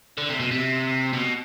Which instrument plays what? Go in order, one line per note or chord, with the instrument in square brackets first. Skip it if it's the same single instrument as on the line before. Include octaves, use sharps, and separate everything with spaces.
[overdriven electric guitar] D3
C3
B2
C3
B2